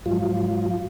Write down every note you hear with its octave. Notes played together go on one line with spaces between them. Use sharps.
G#2 F3 F#3 F4